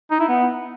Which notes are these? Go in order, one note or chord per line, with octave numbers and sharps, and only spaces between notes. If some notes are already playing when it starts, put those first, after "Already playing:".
D#4
E4
B3